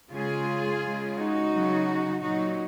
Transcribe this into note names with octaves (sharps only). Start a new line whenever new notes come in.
C#3 G#3 F4 G#4
C#3 G#3
D#4 F#4
C#3 F#3
A#2 F#3 D#4 F#4